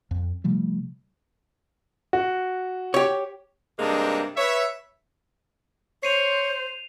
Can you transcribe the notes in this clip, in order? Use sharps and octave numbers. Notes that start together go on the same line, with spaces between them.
F2
C3 F3 G3 A3
F#4
G4 C#5
G2 C3 G#3 A#3 D4 D#4
B4 C#5 E5
C5 C#5 C7 D#7 F7